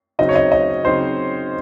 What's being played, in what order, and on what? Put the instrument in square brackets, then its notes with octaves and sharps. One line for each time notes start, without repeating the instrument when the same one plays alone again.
[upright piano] C#3 F#3 C4 D#4 [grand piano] D#5
[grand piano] C#5
D#5
D#5
[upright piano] C#3 F#3 C4 D#4 [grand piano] C5